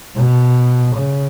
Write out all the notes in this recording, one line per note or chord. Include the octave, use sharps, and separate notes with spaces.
B2
C#3